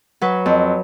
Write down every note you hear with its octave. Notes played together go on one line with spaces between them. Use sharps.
F#3 B4
F2